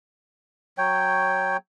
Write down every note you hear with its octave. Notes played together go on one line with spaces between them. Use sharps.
F#3 C#5 G5